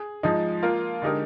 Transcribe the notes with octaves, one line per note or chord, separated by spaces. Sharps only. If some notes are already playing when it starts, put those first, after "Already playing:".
Already playing: G#4
F3 G#3 D#4
A#3 F4 A#4
D3 G#3 D#4 G4 A#4